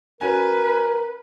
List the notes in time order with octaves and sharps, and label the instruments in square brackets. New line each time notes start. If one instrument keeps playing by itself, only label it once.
[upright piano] C#4 F#4 G#5 [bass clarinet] A#4 [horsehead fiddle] B4